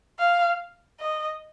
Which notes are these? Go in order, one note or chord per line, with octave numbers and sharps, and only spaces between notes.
F5
D#5